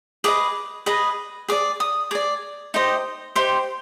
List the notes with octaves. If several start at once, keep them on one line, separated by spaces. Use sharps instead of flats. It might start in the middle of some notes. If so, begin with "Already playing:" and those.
G#4 B4 D#5 D6
G#4 B4 D#5
G#4 D5 D6
D#6
G#4 D5 D6
D#4 G4 C5 D#5
D#4 G4 C5 C6